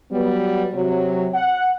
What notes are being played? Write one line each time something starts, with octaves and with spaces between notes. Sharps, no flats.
F#3 G3 B3
C3 F#3
F#5